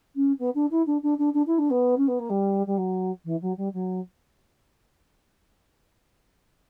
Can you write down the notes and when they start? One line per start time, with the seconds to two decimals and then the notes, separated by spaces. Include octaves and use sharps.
0.15 C#4
0.38 B3
0.54 D4
0.70 E4
0.86 D4
1.02 D4
1.18 D4
1.33 D4
1.46 E4
1.58 D4
1.70 B3
1.97 C#4
2.07 B3
2.18 A#3
2.29 G3
2.66 G3
2.77 F#3
3.24 E3
3.41 F#3
3.57 G3
3.73 F#3